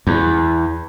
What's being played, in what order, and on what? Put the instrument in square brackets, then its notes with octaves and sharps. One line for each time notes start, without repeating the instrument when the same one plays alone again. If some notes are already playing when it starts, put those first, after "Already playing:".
[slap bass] E2